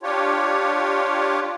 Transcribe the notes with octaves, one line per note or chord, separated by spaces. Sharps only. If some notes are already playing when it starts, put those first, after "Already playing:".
D4 F4 G4 C#5